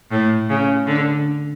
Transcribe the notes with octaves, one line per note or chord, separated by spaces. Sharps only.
A2
C#3
D3